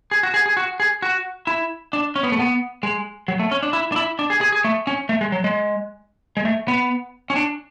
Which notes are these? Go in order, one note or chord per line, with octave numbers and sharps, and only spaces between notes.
G#4
F#4
G#4
G#4
F#4
G#4
F#4
E4
D4
C#4
B3
A3
B3
G#3
F#3
A3
C#4
D4
E4
D4
E4
D4
G#4
G#4
G#4
A3
C#4
A3
G#3
F#3
G#3
G#3
A3
B3
C#4
D4